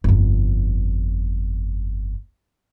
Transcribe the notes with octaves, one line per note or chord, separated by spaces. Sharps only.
G1 F2